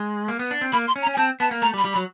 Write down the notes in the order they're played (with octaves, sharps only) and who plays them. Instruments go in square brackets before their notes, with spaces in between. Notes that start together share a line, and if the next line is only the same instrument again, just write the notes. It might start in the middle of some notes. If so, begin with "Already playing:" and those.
Already playing: [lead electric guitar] G#3
A#3
B3
D4
C4
[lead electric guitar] A#3 [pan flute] B5
[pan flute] C6
[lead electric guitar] C#4
[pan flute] A#5
[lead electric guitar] C#4
[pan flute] G#5
[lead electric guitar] C4 [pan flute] A5
[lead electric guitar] B3 [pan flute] A5
[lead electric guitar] A#3
[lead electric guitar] A3 [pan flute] A#5
[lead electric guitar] G3
[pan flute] B5
[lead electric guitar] G3
[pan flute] B5
[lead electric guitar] F#3